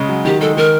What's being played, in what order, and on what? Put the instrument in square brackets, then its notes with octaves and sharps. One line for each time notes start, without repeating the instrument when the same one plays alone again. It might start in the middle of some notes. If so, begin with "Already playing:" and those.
Already playing: [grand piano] C#3 G#3
F#3
[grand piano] D#3 [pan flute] G4
[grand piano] G#3 [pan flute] A4
[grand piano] D#3 [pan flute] A#4